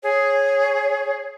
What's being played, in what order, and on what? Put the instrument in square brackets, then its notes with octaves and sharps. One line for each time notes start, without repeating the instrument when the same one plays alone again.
[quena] G#4 [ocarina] C#5